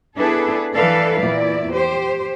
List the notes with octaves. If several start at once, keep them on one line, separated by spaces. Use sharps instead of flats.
B3 D4 E4 G#4 A4 B4
E3 A4 B4 D5 F5
E2 A#2 E4 D5
G4 C5